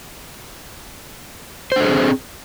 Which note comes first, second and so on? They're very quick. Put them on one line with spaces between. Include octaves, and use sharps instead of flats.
C5 D4 A4 G#4 C4